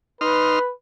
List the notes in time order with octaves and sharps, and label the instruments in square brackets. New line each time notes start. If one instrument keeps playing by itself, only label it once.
[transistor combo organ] D#4 C6 F6 [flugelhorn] B4